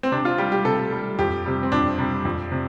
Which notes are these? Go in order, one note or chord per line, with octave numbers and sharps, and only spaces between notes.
C4
C3 D4
F4
G3 G4
G4
C3 A4
G3
F2 G4
C3 G3
C4
F2 D4
C3 G3
F2
C3